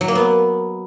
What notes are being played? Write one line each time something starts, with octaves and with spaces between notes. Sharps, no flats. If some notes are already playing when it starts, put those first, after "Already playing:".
F#3
A#3
B3